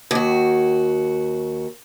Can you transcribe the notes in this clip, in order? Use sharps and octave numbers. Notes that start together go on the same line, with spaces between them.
D#2 F#4